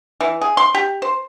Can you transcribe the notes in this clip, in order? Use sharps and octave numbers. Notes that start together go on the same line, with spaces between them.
E3
G#4
C6
G4
C5